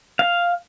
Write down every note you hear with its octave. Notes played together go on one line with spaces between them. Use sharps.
F5